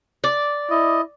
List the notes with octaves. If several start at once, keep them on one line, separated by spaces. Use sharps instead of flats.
D5
E4 D#5